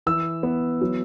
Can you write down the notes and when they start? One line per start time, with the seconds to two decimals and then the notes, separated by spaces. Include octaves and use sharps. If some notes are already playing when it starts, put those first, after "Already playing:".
0.06 E3 E6
0.43 B3
0.81 F#3